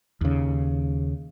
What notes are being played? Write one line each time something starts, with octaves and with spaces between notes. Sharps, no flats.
D#2 C#3